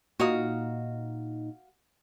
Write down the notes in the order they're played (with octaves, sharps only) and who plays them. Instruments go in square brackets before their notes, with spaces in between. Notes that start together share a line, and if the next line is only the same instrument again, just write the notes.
[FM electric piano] A#2 D#4 [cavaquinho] F#4 F5 D#6